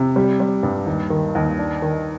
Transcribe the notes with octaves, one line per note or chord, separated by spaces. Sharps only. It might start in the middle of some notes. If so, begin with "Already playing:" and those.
Already playing: C3
G3
G3
G2
D#2
D#3
D#2
D4
D#3